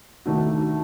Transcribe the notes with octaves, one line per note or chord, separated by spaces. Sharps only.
D#2 D#3 A3 D4 F#4